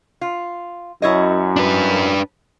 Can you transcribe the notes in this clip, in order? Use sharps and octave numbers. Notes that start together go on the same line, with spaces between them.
F4
F#2 E4 C#5 D#5
D4 B4